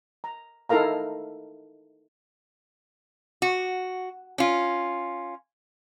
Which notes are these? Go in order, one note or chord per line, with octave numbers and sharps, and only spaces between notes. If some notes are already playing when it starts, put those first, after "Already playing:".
A#5
D#4 E4 A4 A#4 F5 A#5
F#4
C#4 F4